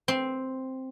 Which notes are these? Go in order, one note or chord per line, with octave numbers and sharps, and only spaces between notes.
C4